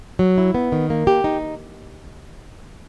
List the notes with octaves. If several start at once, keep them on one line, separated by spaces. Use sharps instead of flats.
F#3
E4
B3
D#3
A#3
G4
D#4